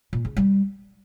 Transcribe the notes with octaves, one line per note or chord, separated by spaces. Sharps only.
A#2
C#3
G3